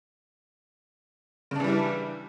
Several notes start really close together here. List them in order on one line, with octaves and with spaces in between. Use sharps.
C#3 D4 E3 G3 E4